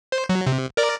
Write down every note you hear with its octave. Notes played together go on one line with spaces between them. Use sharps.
C5
F#3
C3
A#4 D5